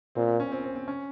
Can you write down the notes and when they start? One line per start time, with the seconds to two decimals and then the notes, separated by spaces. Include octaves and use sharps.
0.15 A#2 C4
0.27 C4
0.40 C#4
0.52 C4
0.64 C4
0.76 C4
0.88 C#4